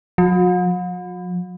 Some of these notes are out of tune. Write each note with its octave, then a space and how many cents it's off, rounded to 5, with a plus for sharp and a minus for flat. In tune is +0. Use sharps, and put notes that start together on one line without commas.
F#3 -45